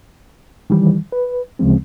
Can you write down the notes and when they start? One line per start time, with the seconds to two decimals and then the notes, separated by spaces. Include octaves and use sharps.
0.70 D#3 E3 G3
1.12 B4
1.59 D2 C#3 F3 G#3 C4